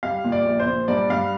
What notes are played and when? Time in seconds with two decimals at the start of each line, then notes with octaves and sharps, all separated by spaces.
0.03 G3 F5
0.24 A#2
0.32 D5
0.45 A#1
0.60 C5
0.67 A#2
0.88 G2 D5
1.10 G2 F5